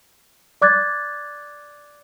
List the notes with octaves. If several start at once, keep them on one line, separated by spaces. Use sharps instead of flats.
D5 D6 F#6 G#6 A6